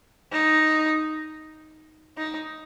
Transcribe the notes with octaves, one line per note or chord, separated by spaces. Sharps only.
D#4
D#4